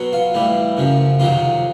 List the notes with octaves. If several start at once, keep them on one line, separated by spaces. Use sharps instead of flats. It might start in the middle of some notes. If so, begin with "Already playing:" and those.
Already playing: B2 F#3
F4
A2 E3 G3
F#2 C#3 F3
F2 C3 D#3 F#3 F4